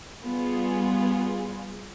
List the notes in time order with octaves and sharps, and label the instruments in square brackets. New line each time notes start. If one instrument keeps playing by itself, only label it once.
[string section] G3 B3 F4 G#4